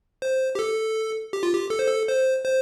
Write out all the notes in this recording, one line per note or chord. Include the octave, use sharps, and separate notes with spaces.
C5
G4
A4
G4
F4
G4
A4
C5
A4
C5
C5